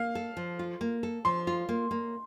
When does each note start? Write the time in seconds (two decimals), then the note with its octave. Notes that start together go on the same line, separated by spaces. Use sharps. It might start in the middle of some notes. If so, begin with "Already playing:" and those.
Already playing: A#3 F5
0.15 A4
0.37 F3
0.59 F4
0.81 A#3
1.03 A4
1.25 F3 C6
1.47 F4
1.69 A#3
1.91 A#3